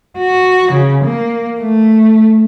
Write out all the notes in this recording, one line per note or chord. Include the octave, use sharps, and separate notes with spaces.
F#4
C#3
A#3
A3